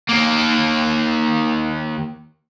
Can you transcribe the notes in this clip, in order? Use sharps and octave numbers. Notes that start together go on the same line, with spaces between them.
D#2 A#3